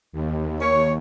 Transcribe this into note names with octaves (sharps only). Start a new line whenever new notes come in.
D#2
C#5